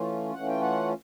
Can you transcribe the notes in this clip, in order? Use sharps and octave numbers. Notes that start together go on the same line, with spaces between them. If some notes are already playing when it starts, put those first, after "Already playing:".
Already playing: E3 A3 C#4 F4
E3 A3 C#4 F4 F#5
G5
F#5